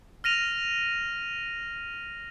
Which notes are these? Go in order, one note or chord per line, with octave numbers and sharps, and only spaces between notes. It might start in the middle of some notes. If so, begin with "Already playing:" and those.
F6 A#6 D#7 F7